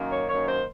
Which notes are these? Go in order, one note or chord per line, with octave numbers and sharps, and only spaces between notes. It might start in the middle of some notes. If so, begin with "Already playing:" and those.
Already playing: F#2 D#3 A#3
C#5
F#2 D#3 A#3 C#5
C5